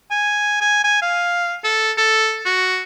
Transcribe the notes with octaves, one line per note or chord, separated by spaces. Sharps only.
G#5
G#5
G#5
F5
A4
A4
F#4